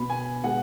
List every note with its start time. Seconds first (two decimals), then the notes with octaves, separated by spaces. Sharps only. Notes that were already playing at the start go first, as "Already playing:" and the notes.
Already playing: B2 B3 B5
0.10 G#5
0.43 B2 G#3 B3 F#5